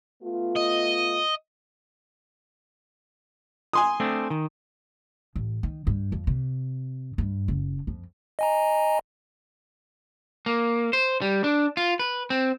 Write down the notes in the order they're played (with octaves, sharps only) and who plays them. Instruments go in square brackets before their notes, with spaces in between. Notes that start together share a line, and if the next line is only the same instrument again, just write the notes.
[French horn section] A3 B3 F4
[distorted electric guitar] D#5
[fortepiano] G#5 C6 D#6
[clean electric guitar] A3 C4 D4
D#3
[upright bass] A1
D#3
G2
F2
C3
G2
F#1
F2
[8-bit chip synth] D#5 G#5 A#5
[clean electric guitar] A#3
C5
G3
D4
F4
B4
C4